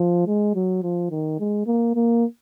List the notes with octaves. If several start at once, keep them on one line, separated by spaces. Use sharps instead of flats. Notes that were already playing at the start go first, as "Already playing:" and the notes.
Already playing: F3
G#3
F#3
F3
D#3
G#3
A#3
A#3